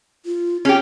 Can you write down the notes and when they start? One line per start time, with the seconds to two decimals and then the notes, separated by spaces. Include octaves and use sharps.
0.25 F4
0.65 C#4 G4 G#4